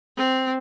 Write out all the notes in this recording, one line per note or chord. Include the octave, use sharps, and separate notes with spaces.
C4